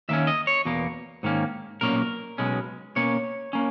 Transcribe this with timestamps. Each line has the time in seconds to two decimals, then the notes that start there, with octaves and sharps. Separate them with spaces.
0.09 D#2 D#3 A#3 C#4 E5
0.27 D#5
0.47 C#5
0.65 E2 B2 A#3
1.23 G#2 D#3 A#3 C#4
1.81 B1 A#2 A#3 C#4 A#4
2.38 B1 B2 G#3 C#4
2.96 B2 A#3 C#4 C#5
3.53 A#3 C#4